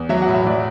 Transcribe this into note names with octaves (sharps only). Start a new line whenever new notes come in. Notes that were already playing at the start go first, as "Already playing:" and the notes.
Already playing: E2
F#3 E5
F#5
A2
E5
F#3 D5